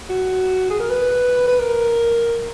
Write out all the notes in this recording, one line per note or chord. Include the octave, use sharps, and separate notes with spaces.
F#4
G#4
A#4
B4
B4
A#4